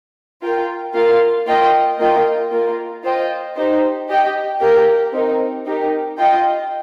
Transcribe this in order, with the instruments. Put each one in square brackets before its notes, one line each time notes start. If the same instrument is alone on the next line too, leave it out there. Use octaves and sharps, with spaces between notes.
[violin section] F4 A#4 G5
A#3 F4 A#4 F5
A#3 F4 D#5 G5
A#3 F4 A#4 D#5 G5
A#3 F4 A#4
F4 C5 D#5 G5
D#4 G4 C5
G4 D#5 G5
A#3 G4 A#4 G5
C4 D#4 A#4
D#4 G4 A#4
F4 D#5 G5